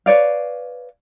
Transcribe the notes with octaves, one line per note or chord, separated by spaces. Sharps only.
B4 C#5 D5 F5